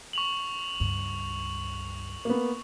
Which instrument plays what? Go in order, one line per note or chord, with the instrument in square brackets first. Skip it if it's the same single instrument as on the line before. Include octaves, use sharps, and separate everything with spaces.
[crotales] C#6 F7 F#7
[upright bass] C#2 G2
[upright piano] A#3 B3